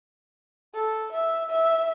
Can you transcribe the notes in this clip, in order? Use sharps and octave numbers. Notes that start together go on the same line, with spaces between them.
A4
E5
E5